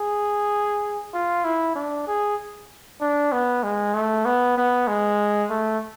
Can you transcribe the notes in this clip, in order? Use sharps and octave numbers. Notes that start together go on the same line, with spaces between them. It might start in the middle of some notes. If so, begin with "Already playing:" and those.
Already playing: G#4
F4
E4
D4
G#4
D4
B3
G#3
A3
B3
B3
G#3
A3